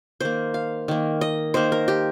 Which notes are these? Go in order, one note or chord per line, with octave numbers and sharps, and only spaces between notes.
D#3 A#3 C5
F5
D#3 A#3
D#5
D#3 A#3 C5
A#4
G4